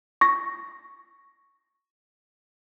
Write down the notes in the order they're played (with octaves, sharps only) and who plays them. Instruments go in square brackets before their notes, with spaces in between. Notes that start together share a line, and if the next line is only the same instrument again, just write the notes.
[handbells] C#6 A#6